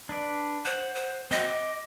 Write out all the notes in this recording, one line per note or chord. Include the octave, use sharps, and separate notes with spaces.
D4 B4 D5
C5 F#5
C5
C4 F#4 D#5
D6